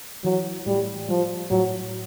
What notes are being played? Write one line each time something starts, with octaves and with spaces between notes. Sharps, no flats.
E3 F#3
A2 G3
F3 G3
A2 F#3